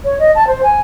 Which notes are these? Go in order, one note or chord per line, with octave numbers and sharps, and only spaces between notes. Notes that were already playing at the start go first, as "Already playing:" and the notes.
C#5
D#5
A5
C5
G#5